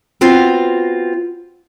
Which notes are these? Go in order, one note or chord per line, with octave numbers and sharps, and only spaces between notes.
B3 C4 F4 F#4